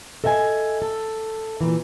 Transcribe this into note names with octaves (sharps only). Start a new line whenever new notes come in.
A4 D#5 E5 G5 G#5
A4
A#2 E3